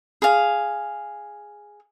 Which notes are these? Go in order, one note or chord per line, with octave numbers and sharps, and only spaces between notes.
G#4 F5